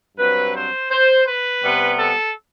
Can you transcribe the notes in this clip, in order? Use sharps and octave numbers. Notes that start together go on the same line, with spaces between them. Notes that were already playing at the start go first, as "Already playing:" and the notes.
G2 F#3 C4 B4
C5
C5
B4
C3 G3 B3
A4